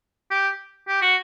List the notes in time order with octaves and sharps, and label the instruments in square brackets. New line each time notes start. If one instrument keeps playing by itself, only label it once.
[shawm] G4
G4
F#4